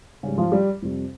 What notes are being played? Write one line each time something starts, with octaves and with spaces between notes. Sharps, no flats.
G#2 C#3 G3 C#4
F3 F4
G3 G4
F2 C3 G3